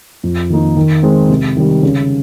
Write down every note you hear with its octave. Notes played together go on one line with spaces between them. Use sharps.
F2
D#3 A#3 D#4
D#3
G#3 C4
C3
D#3 G3
C#3